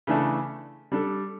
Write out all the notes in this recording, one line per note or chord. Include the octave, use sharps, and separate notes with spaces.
C#3 E3 A3 D4 A4
G3 D4 A4